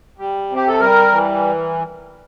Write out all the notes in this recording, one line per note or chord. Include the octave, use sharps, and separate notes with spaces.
G3
C3
G4
A4
G3 A#4
E3